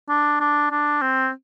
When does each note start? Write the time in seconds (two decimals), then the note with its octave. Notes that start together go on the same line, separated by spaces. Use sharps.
0.09 D4
0.40 D4
0.71 D4
1.02 C4